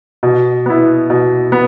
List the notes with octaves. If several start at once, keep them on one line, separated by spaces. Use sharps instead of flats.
B2
B3 E4
B2
B3